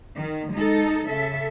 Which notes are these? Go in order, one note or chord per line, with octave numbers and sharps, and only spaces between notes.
D#3
G#3 D#4 A4
C#3 A4 E5